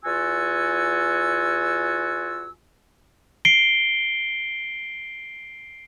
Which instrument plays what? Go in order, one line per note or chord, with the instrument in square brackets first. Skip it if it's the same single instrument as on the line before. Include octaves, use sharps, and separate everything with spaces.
[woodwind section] E2 F4 F#4 G#5 E6
[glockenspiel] C7 D7 G7